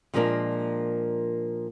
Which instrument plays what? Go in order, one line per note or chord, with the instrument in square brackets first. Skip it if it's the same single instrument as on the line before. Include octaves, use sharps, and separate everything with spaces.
[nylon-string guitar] A#2 F3 G#3 A#3 D4 A#4